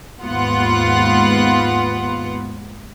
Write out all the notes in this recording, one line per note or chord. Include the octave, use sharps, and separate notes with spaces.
D#2 G#2 B3 F4 F#5